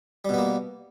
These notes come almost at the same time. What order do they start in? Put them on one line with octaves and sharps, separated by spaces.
G3 B2 B3 A#3